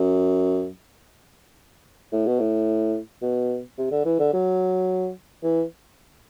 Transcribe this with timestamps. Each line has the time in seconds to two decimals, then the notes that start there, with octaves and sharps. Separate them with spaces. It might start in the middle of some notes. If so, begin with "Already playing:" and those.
Already playing: F#2
2.12 A2
2.26 B2
2.40 A2
3.22 B2
3.78 C3
3.91 D3
4.05 E3
4.20 D3
4.33 F#3
5.43 E3